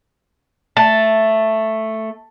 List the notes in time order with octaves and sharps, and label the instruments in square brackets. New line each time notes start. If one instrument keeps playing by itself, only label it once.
[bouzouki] A3 [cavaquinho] A5